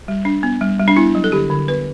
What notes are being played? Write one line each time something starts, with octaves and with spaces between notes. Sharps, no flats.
G3
D4
B3
G3
G3
D4
B3 E4
F#3
A4
D3 G4
D3
B3 B4